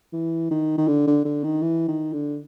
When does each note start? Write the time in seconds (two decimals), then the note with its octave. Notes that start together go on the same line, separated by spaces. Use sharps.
0.13 E3
0.51 D#3
0.78 D#3
0.88 D3
1.07 D3
1.25 D3
1.44 D#3
1.62 E3
1.88 D#3
2.13 D3